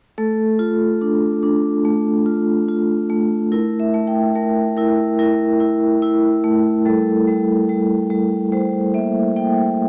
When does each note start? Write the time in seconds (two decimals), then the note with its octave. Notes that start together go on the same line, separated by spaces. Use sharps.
0.18 A3 A4
0.59 F4
1.01 D4
1.43 D4
1.85 A3
2.26 F4
2.69 F4
3.10 A3
3.52 E4 A#4
3.80 E5
3.94 A3
4.07 G5
4.35 A3 A#4
4.77 E4 A#4
5.19 E4 A#4
5.60 E4
6.02 E4
6.44 A3
6.85 G3 A4
7.27 G3
7.69 G3
8.10 G3
8.52 G3 C5
8.94 A#3 E5
9.36 A#3 G5